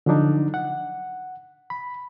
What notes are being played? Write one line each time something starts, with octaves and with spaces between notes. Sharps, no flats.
D3 F3 F#3 D4 D#4
F#5
B5